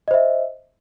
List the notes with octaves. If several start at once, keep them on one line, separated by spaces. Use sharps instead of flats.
C5 D#5 E5